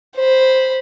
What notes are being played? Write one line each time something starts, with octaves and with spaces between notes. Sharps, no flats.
C5 B5